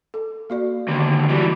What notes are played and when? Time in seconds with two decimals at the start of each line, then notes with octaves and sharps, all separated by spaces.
0.14 A4
0.50 A#3 F#4 D5
0.88 D#2 D3
1.30 E3 G3 D#4 F#4